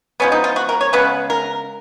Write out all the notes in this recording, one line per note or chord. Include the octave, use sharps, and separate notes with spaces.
F3 G#3 B3 C#4
D#4
F4
F#4
A#4
C#5
C#3 G#3 B3 B4
A#4